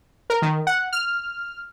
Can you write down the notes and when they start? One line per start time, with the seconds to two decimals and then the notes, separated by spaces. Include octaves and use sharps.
0.30 A#4
0.42 D#3
0.67 F#5
0.92 F6